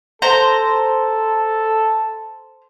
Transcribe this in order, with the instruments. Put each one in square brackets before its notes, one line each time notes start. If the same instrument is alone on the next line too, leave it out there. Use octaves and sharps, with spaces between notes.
[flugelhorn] A4 [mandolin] C5 A#5